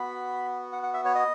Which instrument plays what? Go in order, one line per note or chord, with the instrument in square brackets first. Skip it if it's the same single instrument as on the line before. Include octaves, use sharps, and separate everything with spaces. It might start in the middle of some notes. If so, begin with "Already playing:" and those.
Already playing: [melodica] B3 F#4 B5
F#5
F#5
E5
C#5
D#5